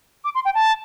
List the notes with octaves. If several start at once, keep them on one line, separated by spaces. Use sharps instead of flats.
D6
C6
G5
A5